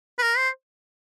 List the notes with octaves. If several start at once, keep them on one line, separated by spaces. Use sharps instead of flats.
B4
A#4
C5